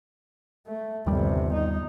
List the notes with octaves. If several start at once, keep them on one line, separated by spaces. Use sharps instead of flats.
A3
G1 D#2 C3 G3
D#4